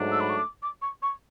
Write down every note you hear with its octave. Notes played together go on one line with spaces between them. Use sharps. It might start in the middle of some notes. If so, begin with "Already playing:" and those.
Already playing: G#2 F#3 A3 D4
E6
B5
C#6
D6
D6
C#6
C#6